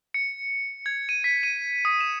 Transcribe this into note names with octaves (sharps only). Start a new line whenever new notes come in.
C#7
G#6
D#7
B6
D#7
D#6
E7